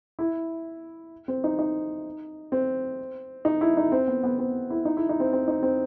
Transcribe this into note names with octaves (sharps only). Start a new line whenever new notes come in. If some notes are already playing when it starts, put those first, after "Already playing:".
E4
C4
D#4
D#4
C4
D#4
E4
D#4
C4
B3
B3
C4
E4
D#4
E4
D#4
C4
C4
D#4
C4